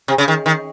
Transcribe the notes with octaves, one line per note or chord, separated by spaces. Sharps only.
C3
C#3
D#3
D#3